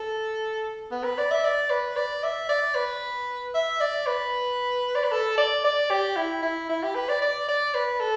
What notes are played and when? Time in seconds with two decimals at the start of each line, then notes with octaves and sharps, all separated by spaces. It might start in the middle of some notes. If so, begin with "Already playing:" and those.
Already playing: A4
0.91 B3
1.04 B4
1.18 D5
1.31 E5
1.44 D5
1.70 B4
1.96 D5
2.23 E5
2.49 D5
2.75 B4
3.54 E5
3.80 D5
4.06 B4
4.95 D5
5.04 B4
5.12 A4
5.38 D5
5.64 D5
5.90 G4
6.16 E4
6.42 E4
6.69 E4
6.83 G4
6.95 B4
7.09 D5
7.22 D5
7.48 D5
7.74 B4
8.00 A4